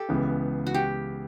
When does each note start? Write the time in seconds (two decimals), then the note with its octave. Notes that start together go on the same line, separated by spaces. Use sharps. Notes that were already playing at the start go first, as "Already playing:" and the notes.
Already playing: G4 A4
0.09 C#2 C#3 E3 B3
0.67 F#4
0.74 G4